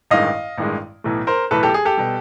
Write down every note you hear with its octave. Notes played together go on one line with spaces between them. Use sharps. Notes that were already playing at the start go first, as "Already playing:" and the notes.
A1 G2 D#3 G#3 D#5 F5
A1 G2 D#3 G#3
B1 A2 E3 A3
A#4 C5
B1 A2 E3 A3 A4 B4
G4 A4
G#4
G4 A4
B2 G3